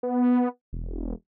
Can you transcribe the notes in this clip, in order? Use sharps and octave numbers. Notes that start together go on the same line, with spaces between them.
B3
E1